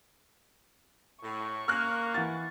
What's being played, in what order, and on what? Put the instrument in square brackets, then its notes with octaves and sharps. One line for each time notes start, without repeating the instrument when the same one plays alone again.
[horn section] A2 [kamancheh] C#6
[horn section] A#3 [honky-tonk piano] F6 F#6
[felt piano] E3 F#5 A6